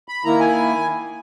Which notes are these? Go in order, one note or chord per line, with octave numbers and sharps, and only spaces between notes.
B5
D#3 A#3 E4 A#5
G#5